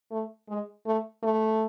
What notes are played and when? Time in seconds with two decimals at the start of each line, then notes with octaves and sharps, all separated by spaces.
0.11 A3
0.48 G#3
0.86 A3
1.23 A3